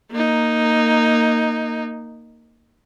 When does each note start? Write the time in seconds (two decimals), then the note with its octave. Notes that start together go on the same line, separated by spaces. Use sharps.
0.11 A#3 D#4